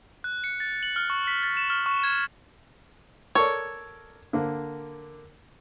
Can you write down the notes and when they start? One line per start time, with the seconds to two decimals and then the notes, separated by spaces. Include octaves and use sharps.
0.24 F#6
0.44 C#7
0.60 A6
0.83 F#7
0.96 F6
1.10 C#6
1.27 B6
1.43 A6
1.57 E7
1.70 F6
1.86 C#6
2.04 G#6
3.35 A4 A#4 C#5 D5
4.33 D3 A#3